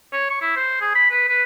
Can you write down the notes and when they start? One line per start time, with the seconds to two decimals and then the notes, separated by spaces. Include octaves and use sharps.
0.13 C#5
0.30 C#6
0.41 E4
0.56 C5
0.81 G#4
0.95 B5
1.10 B4
1.28 B4